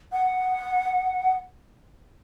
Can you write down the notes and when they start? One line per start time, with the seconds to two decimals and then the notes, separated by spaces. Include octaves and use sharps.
0.12 F#5